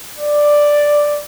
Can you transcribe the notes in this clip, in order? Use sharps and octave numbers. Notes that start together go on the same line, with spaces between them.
D5